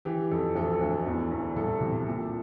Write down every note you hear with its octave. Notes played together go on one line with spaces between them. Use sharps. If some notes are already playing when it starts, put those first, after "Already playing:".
E3 G4
F2 A4
D2 A4
D2
E2
E2
C2 A4
C3
A#2